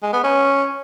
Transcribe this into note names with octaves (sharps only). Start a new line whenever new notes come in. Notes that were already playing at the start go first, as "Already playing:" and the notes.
G#3
B3
C#4